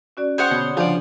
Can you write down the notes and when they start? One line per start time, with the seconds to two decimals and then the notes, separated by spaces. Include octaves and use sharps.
0.17 C#4 F#4 D5
0.38 G#4 C5 C#5 F#5
0.51 B2 D3 B5
0.77 C#3 F3 D4 G#4 D5 G6